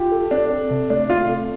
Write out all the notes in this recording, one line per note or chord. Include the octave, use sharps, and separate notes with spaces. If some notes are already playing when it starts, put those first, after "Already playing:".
Already playing: F4 G4
A4
C4 D4
A4
C3
A3 D4
C4 F4
A4